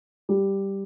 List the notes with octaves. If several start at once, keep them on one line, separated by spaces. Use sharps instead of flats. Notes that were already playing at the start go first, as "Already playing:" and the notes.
G3